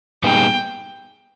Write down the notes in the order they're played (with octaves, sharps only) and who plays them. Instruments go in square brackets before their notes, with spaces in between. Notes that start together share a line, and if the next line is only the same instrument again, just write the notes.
[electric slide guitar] A#2 G3 B3 D#4 G#4 [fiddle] G5